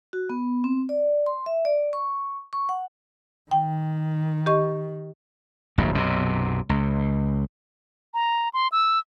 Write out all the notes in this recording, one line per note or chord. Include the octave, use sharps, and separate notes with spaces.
F#4
B3
C4
D5
C6
E5
D5
C#6
C#6
F#5
D#3 G5
G4 D#5 C#6
D1 A#1 G2
B1 F#2 C3
C#2
A#5
C6
E6